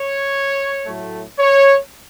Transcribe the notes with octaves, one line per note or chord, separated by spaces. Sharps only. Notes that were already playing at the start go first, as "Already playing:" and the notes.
Already playing: C#5
A2 F#3 A3
C#5